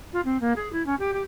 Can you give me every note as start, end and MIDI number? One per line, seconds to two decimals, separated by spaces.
0.13 0.20 65
0.24 0.37 60
0.40 0.52 58
0.55 0.70 68
0.72 0.84 64
0.86 0.94 61
0.99 1.11 67
1.13 1.21 67